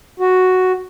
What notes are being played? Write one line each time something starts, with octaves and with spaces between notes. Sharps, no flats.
F#4